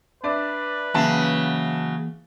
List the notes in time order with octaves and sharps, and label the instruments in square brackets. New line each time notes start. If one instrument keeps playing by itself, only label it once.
[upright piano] D4 D5 E5 [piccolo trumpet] B4
[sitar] C#3 F#3 [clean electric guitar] E3 A#3 F5 [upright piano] E5 A5